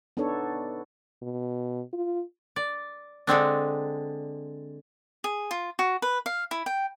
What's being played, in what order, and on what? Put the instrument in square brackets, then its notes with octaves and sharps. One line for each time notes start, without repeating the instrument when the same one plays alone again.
[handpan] B3 D4 D#4 A4 C#5
[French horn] B2
F4
[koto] D5
D3 G#3 C4 D4
[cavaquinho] G#4
F4
F#4
B4
F5
E4
G5